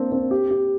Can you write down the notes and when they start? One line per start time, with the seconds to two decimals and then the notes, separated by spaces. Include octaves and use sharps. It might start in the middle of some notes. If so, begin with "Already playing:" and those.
Already playing: A#3 C4 D4
0.12 C4
0.31 G4
0.51 G4